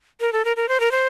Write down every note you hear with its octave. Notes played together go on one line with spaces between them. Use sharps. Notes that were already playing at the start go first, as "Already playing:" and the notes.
A#4
A4
A#4
A#4
C5
A#4
C5